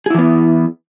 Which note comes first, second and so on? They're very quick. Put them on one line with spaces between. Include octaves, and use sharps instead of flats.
G#4 E4 E3 B3